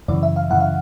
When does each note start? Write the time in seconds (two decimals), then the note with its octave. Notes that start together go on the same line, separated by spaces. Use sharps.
0.08 F#2 C#3 E3 D5
0.23 E5
0.36 F5
0.50 F#2 C#3 E3 F#5
0.60 F5